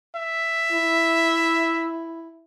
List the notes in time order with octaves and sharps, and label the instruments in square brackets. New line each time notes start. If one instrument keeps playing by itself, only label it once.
[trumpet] E5
[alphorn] E4